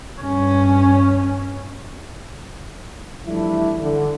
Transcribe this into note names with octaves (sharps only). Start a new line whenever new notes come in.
G2 C#4
E3 F3 G3 A3 D4 E4
D3